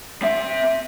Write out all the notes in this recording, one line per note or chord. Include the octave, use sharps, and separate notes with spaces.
C4 E5